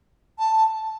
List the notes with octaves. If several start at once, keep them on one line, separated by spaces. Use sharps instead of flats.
A5